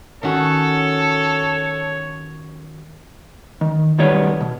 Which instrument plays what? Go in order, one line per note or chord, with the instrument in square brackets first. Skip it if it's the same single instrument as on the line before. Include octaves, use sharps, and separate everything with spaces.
[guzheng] D#3 C#4 F#4 [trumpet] A4 [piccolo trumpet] C#5
[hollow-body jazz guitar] D#3
B1 B2 D#3 G3 B3 C#5
B2